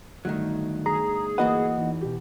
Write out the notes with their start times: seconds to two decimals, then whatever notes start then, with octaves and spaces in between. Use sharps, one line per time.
0.25 G1 D#3 F#3 A3 D#4
0.86 G#4 A#5
1.38 E3 A#3 F#4 B4 D#5 F#5
1.77 E2 D#4
2.01 B2 G4